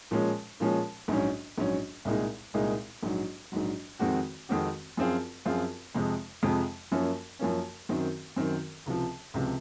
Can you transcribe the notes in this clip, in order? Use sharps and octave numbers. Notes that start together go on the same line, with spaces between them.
A#2 F3 G#3 C#4
A#2 F3 G#3 C#4
A#1 G#2 F#3 C#4
A#1 G#2 F#3 C#4
C2 A#2 G#3 D#4 G#4
C2 A#2 G#3 D#4 G#4
A#1 G#2 F#3
A#1 G#2 F#3
F2 D#3 G#3 C4 F#4
F2 D#3 G#3 C4 F#4
F#2 F3 C4 F4 G#4
F#2 F3 C4 F4 G#4
F2 C3 F3 G#3
F2 C3 F3 G#3
F#2 F3 A#3 C#4
F#2 F3 A#3 C#4
F#2 D#3 F#3 C4
F#2 D#3 F#3 C4
C#2 C3 F3
C#2 C3 F3